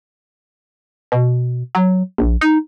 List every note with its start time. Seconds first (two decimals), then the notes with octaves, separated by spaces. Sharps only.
1.12 B2
1.75 F#3
2.18 A#1
2.41 D#4